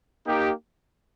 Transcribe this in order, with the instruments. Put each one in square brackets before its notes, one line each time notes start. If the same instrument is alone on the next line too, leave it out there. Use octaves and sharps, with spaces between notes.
[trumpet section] A#3 D#4 G4